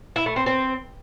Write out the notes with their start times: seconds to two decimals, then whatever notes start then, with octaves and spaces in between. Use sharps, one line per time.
0.16 E4
0.26 A3
0.36 C4
0.46 C4